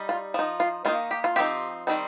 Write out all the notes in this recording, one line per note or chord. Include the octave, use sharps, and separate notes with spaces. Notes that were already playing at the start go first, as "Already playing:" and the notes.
Already playing: G3 D#4
F4
F3 D#4
F4
D#3 A#3 D#4 F4
G4
F4
F3 C4 D#4 G4
D#3 G3 C4 D#4